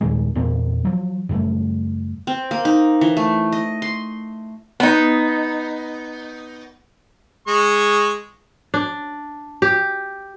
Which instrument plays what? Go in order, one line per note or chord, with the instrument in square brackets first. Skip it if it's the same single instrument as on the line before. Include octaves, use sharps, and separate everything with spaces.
[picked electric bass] D#2 A#2 D#3 G#3
E2 A#2 A#3 C4
F3 F#3
F#2 C#3 G3 A3
[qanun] C4
A#3
D#4
E3
A3
D#5
C6
[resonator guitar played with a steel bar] B3 D#4
[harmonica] G#3 C#6
[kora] D4
G4